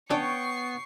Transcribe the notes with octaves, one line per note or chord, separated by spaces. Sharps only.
B3 C#4 D4 C#5 G5 C#6 C7